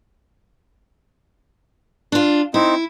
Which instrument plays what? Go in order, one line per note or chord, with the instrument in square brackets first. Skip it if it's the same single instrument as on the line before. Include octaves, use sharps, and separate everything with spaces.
[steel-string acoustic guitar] D4 F4
[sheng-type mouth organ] C4 D#4 [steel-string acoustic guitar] E4